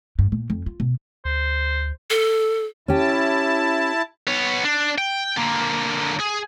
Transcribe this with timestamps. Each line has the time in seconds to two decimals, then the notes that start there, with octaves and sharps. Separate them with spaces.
0.19 G2
0.32 A#2
0.50 F2
0.66 F4
0.80 B2
1.25 D2 C5
2.10 A4
2.88 C#4 E4 G4 A5
4.27 B3 C#5
4.64 D4
4.98 G5
5.37 D3 A#3
6.20 G#4